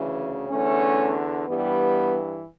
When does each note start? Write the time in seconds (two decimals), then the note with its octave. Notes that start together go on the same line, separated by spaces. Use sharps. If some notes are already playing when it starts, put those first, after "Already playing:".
Already playing: D2 C#3 E3
0.48 E2 D3 A3 C#4
1.46 G2 E3 G3 B3